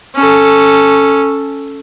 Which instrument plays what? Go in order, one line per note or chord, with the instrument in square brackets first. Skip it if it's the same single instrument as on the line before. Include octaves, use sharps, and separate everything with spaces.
[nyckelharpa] C#4 A4